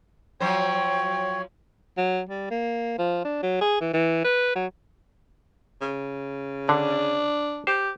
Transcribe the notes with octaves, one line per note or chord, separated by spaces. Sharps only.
F3 F#3 C5 C#5 G5
F#3
G3
A#3
F3
D4
F#3
G#4
E3
E3
B4
F#3
C#3
D3 D4
G4 C5